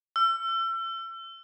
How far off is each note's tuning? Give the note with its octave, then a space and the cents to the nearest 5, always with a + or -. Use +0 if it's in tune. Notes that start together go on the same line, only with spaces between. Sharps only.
E6 +35